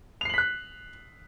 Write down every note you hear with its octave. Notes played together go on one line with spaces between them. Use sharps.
F#6 B6 C7 F7 F#7